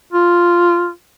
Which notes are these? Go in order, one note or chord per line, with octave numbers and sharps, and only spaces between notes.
F4